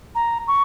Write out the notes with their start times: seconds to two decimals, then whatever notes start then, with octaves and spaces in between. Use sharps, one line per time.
0.15 A#5
0.48 C#6